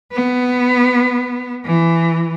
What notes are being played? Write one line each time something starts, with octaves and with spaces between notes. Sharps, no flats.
B3
E3